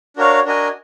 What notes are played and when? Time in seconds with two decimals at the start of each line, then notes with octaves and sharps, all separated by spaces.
0.17 D4 F#4 A#4 C#5 F5
0.45 D4 F#4 A#4 D#5 G#5